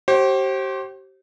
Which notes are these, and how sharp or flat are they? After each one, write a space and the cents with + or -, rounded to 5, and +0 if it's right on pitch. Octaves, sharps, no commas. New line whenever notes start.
G4 -35 C5 +30